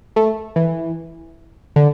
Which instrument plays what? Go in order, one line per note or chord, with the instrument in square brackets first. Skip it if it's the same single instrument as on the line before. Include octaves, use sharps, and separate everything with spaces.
[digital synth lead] A3
E3
D3